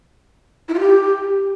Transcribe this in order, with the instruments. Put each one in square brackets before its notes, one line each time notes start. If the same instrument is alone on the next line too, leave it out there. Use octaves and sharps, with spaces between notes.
[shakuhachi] E4
F4
G4